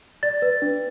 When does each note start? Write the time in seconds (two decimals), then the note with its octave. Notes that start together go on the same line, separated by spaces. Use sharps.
0.23 D5 A6
0.42 B4
0.62 D4